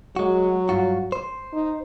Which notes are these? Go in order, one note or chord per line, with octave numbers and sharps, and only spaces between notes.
F#3 G#3 F#4
G2 F4 F#4
C5
D#4